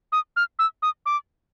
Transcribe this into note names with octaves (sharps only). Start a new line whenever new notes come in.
D#6
F6
E6
D#6
D6